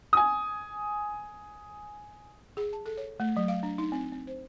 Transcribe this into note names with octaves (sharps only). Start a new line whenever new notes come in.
G#5 D#6
G#4
A5
A4
C#5
A3
F#3
F5
D4
D#4
C4
C4
C5